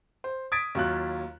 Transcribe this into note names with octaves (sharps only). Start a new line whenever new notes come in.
C5
D#6 G#6 A6 B6 D7
D#2 F#3 F4 F#6